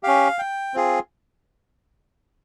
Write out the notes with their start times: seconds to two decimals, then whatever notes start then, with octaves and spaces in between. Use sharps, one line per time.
0.03 C#4 G4 F5
0.39 G5
0.74 C4 F4 G#4